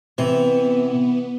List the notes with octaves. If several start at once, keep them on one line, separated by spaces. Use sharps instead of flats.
C3 E3 B3